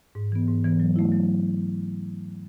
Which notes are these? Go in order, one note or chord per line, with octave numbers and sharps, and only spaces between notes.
G#2
E3 B3
G#2
E3 B3
F#3
A3 E4
F#3